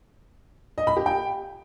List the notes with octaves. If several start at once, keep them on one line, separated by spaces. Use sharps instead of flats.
D#5
B5
G4
G5